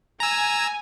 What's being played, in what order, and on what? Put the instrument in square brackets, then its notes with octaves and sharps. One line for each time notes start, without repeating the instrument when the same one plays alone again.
[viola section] G#5 [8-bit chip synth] A#5 E6